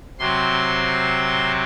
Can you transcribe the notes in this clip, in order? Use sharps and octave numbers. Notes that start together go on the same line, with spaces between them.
C3 F#3 C4 C6